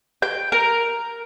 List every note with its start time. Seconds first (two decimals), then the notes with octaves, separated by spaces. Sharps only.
0.22 G5
0.52 A#4